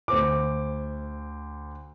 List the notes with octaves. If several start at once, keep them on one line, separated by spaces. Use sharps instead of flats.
D2 C5 D6